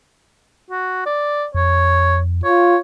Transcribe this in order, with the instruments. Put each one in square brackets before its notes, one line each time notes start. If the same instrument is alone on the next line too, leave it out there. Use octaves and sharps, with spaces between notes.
[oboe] F#4
D5
[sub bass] F2 [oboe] C#5
[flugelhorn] F4 [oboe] C#5